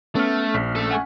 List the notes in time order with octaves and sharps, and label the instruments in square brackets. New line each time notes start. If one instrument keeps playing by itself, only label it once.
[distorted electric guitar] A3 [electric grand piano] B3 [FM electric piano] C#4 F6
[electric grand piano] A#1 B6
[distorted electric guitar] A3 A4
[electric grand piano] F#5 G#5 C#6